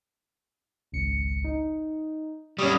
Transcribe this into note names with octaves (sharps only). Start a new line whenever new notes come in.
G#1 C#2 C#7
D#4
G3 C#4 B5 C#6 D#6